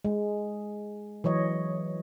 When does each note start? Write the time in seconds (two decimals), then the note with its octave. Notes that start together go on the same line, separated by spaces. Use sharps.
0.05 G#3
1.24 E3 F#3 C#5 D#5